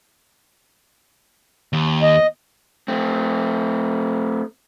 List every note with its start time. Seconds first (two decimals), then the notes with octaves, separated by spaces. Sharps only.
1.73 D#2
2.02 D#5
2.88 A3 C4